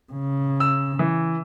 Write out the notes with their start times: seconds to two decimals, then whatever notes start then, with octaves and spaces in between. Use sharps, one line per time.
0.13 C#3
0.60 E6
0.99 E3